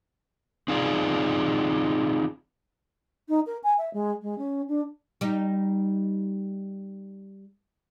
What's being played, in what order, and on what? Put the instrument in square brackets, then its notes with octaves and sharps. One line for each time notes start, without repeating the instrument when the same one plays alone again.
[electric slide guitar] C4 D#4 F4 G#4 D5
[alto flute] D#4
A#4
G#5
E5
G#3
G#3
C#4
D4
[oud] G3 D#4